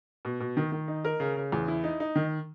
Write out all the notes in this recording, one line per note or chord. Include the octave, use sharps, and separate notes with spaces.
B2
B2
D#3
D#3
D#4
A#4
C#3
C#3
E2
E4
D#4
D#4
D#3